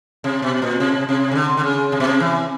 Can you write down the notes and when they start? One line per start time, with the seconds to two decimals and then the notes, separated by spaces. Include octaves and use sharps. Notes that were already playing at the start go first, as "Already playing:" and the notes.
0.24 C3
0.42 B2
0.62 A#2
0.80 C3
1.09 C3
1.31 C#3
1.36 D3
1.57 D3
1.64 C#3
1.92 C3
2.00 B2
2.07 C3
2.20 E3